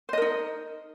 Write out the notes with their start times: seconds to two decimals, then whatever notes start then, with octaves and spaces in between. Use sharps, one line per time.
0.09 C5
0.13 D#5
0.17 A#4
0.22 D#4